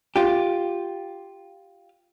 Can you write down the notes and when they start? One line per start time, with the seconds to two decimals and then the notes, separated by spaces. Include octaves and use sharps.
0.16 F4 G4